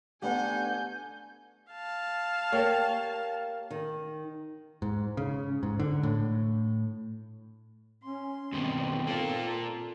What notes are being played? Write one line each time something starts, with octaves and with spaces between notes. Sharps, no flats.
A3 B3 D4 G4 D5 F#5 G#5 G6
F5 A5
A#3 G4 C#5
D#3
G#2
C#3
G#2
D3
A2
C#4 C6
G2 B2 D#3 C4
A#3 F4 A4